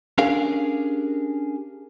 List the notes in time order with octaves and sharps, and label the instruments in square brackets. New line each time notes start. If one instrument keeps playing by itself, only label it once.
[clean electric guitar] C#4 D4 G4 G#4 A#4 F5